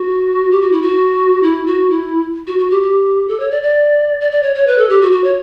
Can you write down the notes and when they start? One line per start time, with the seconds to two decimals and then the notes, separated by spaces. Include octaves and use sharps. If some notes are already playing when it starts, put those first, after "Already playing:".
Already playing: F#4
0.51 G4
0.61 F#4
0.72 E4
0.82 F#4
1.43 E4
1.66 F#4
1.90 E4
2.47 F#4
2.59 F#4
2.71 G4
2.83 G4
3.28 A4
3.40 C#5
3.51 D5
3.63 D5
4.21 D5
4.32 D5
4.43 C#5
4.55 C#5
4.67 B4
4.78 A4
4.89 G4
5.02 F#4
5.12 F#4
5.24 C#5